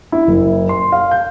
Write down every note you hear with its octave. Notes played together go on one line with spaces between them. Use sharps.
E4
F#1
C6
F5
G6